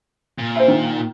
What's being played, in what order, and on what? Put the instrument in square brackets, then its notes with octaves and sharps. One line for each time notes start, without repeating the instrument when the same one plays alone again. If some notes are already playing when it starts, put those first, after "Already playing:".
[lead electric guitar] A#2
[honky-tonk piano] C5 E5
D#3